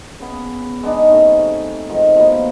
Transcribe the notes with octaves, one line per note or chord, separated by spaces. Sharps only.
C#3 B3
G#3 B3 D4 D#4
C3 A3 C#4 D#4
G#2 D#3 F3
B2 F3 A#3 B3